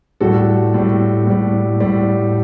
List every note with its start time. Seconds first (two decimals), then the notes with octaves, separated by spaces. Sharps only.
0.20 A2 G3 F#4 A4
0.74 A2 G3
1.27 A2 G3
1.80 A2 G3